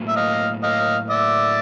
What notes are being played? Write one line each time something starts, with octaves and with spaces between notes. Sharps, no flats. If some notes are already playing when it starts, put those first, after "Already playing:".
Already playing: A2 F#3 A#3
E5
D#5 F5
D#5 F5
D5 E5